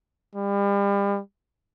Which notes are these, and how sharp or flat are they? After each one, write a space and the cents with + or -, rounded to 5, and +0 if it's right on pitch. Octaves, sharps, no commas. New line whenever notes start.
G3 +35